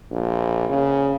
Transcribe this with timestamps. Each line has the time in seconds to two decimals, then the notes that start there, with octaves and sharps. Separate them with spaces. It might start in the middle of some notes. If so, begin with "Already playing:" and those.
0.11 A#1
0.69 C#3